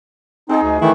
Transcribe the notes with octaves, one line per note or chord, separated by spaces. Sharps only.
G#3 C4 D#4 G#4
D2
D#3 E3 A3 E4